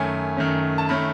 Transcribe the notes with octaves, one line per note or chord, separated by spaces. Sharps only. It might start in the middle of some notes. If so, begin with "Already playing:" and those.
Already playing: F#2 D#3 A3 C#4 G#5
F#2 D#3 A3 C#4
A5
D#3 A3 C#4 B5